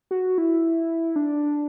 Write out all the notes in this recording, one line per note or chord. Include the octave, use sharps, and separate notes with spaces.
F#4
E4
D4